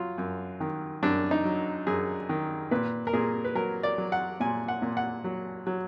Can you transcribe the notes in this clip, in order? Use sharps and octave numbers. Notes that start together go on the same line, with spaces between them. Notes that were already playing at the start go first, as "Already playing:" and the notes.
Already playing: F#3 F4
F#2
D#3
F#2 D4
D#4
F#3
F#2 G#4
D#3
A#2 B4
A#4
A#2 G#4
B4
F#3 A#4
D5
F#3
F#5
A#2 G#5
F#5
A#2
F#5
F#3
F#3